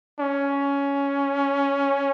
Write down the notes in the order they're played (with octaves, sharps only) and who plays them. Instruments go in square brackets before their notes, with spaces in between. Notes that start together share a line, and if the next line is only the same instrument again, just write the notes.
[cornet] C#4